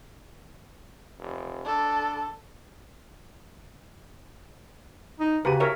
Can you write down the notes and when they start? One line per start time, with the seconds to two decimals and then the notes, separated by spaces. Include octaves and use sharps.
1.19 F1
1.66 D4 A4
5.20 D#4
5.45 C#3 F#4 G4 B4 A#5 D#7
5.60 A#4 C#5 E5